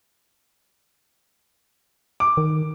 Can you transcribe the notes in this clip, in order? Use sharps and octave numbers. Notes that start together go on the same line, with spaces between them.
D6
D#3